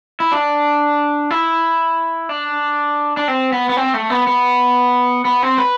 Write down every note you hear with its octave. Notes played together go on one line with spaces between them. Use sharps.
E4
D4
E4
D4
D4
C4
B3
B3
C4
A3
B3
B3
B3
C4
B4